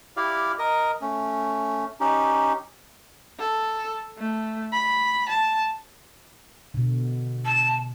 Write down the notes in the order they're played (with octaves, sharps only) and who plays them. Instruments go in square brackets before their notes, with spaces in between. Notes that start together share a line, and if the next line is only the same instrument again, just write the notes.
[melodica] E4 G4 D5 F5
A#4 D#5
A3 C#4
C#4 D#4 G4
[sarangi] A4
A3
B5
A5
[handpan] B2 D3
[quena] A5